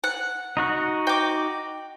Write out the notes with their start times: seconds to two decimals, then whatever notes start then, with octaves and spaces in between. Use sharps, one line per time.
0.04 F#5
0.57 D#4 F#4 F#6
1.07 G5 D6